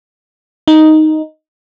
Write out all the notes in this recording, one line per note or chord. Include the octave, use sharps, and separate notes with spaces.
D#4